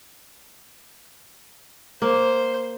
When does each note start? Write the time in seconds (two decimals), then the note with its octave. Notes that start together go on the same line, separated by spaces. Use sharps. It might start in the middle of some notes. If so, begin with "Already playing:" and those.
2.02 A#3 C5